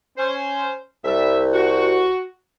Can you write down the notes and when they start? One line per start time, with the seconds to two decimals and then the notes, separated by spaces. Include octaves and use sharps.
0.16 C#4 C5
1.05 C2 G3 E5
1.52 F#4